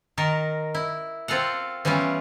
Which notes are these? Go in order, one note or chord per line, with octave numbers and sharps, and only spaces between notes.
D#3 A#4 A5
E4
C4 F4 A4 F5 F#5
E3 G3 B3 C#4 F4